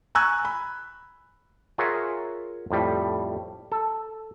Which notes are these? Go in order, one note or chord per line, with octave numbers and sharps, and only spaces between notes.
G#5 A#5 C#6 E6 F#6 G#6
B5
F4 G#4 A#4 C#5 E5 F#5
F2 A2 G3
A4